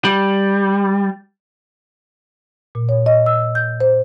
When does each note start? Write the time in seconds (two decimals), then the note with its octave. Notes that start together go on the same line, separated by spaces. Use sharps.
0.05 G3
2.75 A#2
2.89 C#5
3.06 D#5
3.26 E6
3.55 G6
3.80 C5